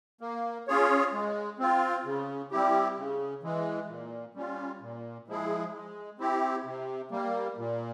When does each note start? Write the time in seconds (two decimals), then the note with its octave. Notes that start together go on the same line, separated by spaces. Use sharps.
0.21 A#3
0.68 C#4 F4 G#4 C#5
1.13 G#3
1.59 C4 F4
2.05 C#3
2.51 G3 C4 E4 G4
2.97 C#3
3.43 E3 G#3
3.89 A#2
4.35 G3 C#4 F4
4.81 A#2
5.28 F3 G#3 E4 G#4
5.73 G#3
6.19 C4 E4 G4
6.65 C3
7.11 G3 A#3
7.57 A#2